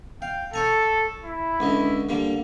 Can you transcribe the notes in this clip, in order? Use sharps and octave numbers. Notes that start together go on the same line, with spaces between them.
F5 G5
A4 C#5 G#5 A#5
E4
C#2 D3 D#5
D3 G3 A#3